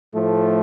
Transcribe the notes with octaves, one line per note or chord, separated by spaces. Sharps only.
A2 F3 A3